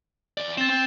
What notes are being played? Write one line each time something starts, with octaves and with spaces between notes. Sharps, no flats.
E2 D5
C4 A6 E7
C4